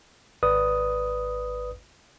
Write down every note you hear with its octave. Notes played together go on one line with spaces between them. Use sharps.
G#1 B4 D5 D#6